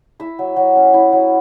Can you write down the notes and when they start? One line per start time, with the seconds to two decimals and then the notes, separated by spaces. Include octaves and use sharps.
0.20 E4 E5
0.39 F#3
0.56 F#3
0.76 C#4
0.94 E4
1.12 F#3